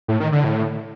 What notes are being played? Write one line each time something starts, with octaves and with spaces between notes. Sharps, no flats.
A2
D#3
D3
A2